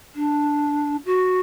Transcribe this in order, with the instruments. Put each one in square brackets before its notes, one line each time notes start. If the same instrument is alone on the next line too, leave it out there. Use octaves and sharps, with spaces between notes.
[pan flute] D4
F#4